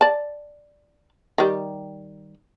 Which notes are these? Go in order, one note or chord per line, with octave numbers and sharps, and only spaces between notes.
D5 A5
D#3 G3